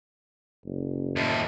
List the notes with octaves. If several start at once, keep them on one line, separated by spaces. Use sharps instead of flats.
F#1
D#2 A2